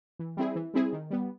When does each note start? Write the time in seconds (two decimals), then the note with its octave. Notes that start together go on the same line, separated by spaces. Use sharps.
0.19 E3
0.37 G3 C4 E4 G#4
0.56 E3
0.74 G3 C4 E4 G#4
0.93 D#3
1.11 G3 B3